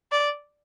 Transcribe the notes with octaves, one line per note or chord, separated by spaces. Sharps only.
D5